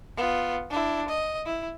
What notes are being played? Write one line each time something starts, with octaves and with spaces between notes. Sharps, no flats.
B3 F4
D4 E4
D#5
E4